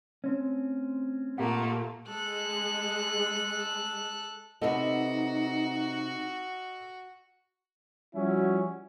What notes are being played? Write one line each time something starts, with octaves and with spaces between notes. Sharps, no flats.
A3 C4 C#4
A#2 A3 A#3 G4 F#5
G#3 A4 F#6
C3 B3 D#4 F#4 A4 D#5
F3 G3 C#4 E4 F#4